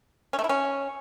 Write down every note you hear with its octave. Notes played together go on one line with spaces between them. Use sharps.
C#4
A3
E4
C#4